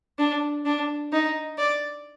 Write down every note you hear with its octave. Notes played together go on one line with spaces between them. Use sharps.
D4
D4
D#4
D5